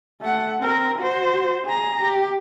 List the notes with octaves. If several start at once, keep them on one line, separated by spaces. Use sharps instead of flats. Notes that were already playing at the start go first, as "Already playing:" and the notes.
A3 F#5
C4 A#4
F#4 C5
G#4 A#5
G4